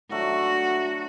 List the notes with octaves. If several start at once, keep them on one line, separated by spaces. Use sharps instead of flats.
F#3 A3 D4 F#4